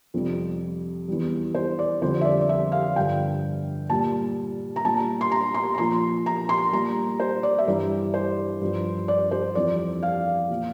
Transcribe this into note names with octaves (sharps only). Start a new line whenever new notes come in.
F2 C3 G3
E2 E3 G3
C5
D5
F2 D3 G3 C5
E5
D5
D5
E5
F5
G2 D3 F3 G5
A#2 G3 A5
A#5
A#2 G3 A5
C6
A#5
C6
A#5
A#2 F3 C6
A#5
C6
A#2 G3 A#5
C5
D5
E5
G2 E3 G3 D5
C5
G2 F3
D5
C5
F2 E3 G3 D5
F5
A#2 F3